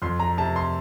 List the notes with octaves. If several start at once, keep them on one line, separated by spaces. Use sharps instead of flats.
F2 C6
A#5
C3 A5
C6